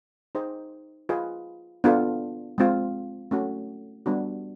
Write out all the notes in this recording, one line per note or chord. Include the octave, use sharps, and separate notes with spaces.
D#4 G#4 C5 D#5 G5
F4 G#4 B4 D#5
B3 D4 F4 A4
G#3 C4 F4
A3 C#4 F#4
G3 B3 D4 F#4